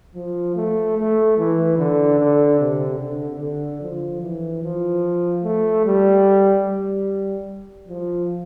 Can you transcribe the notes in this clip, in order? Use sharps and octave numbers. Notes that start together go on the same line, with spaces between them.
F3
A3
A3
E3
D3
D3
C3
D3
D3
F3
E3
F3
A3
G3
G3
F3